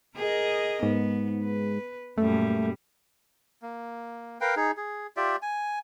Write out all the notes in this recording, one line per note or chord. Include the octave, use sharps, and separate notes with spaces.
G#4 A#4 D#5
G#2 B3
B4
F#2 A#2 G3 A3
A#3
A#4 B4 F5 G5
D#4 G#4
G#4
F4 G4 D5 E5
G#5